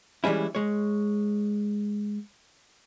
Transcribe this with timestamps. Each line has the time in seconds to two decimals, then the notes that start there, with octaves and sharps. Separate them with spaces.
0.24 E3 G3 G#3 C#4 E4
0.55 G#3 C#5